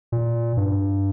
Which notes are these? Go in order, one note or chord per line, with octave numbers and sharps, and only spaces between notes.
A#2
G2